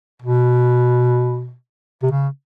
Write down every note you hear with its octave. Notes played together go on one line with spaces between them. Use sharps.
B2
C3
C#3